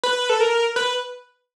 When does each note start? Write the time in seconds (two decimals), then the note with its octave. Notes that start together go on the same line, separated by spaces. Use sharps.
0.04 B4
0.29 A4
0.40 A#4
0.76 B4